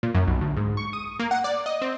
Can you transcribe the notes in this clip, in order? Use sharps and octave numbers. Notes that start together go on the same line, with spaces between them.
A#2
F#2
B1
D2
G#2
C#6
D#6
A#3
F#5
D5
D#5
C4